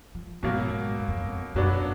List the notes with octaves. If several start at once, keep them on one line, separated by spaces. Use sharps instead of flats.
F3
G#2 B2 F#3 A#3
G#2
F#2
F2
F#2
F2
F#2 B2 F#3 B3 D4